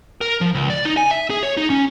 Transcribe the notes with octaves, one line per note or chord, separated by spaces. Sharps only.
A#4
F3
C#2
D5
D#4
G#5
E5
G#4
C#5
D#4
C#4